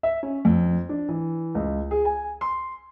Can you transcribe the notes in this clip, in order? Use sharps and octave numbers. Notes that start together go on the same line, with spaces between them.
E5
C#4
F2
D4
E3
C#2
G#4
G#5
C6